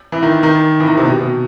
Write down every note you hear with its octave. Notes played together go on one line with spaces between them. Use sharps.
E3
D#3
D#3
E3
D#3
C3
B2
B2